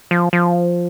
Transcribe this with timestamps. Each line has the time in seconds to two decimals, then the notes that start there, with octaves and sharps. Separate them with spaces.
0.11 F3
0.33 F3